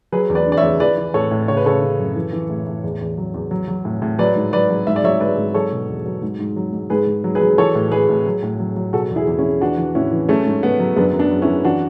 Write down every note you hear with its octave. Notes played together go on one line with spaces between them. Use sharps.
F#3 G#4 B4
E2
B4 D5
D3
D5
C#5 E5
E2
E3 B4 D5
E3
A2 A4 C#5
A2
C#3 C#5
B4
C#3 A4 C#5
C#3
F#2
E3
E3
A2
A2
E2
E2
F#3
E2
F#3
F#3
A2
A2
F#3 B4 D5
G#2
F#3 B4 D5
F#3
G#2 E5
D5
F#3 C#5 E5
G#2 B4 D5
G#2
F#3 A4 C#5
B2
E2
F#3
G#2
G#2
F#3
G#2
G#2 G#4 B4
G#2
F#3
G#4 B4
F#3
E3 A4 C#5
A2
A2 G#4 B4
A2
F#3
A2
F#3
F#3
B2 F#4 A4
E2
E4 G#4
E2
C#4 E4
E2
E3 D4 F#4
E3
A2 C#4 E4
E3
F#3 A3 C#4
G#2
G#2 B3
F#3
F#2 B3 D4
F#2
B3 D4
F#2
C#4 E4
F#2
E3 D4 F#4